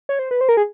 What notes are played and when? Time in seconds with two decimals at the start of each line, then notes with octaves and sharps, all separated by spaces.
0.09 C#5
0.19 C5
0.31 B4
0.41 C5
0.49 A#4
0.57 G#4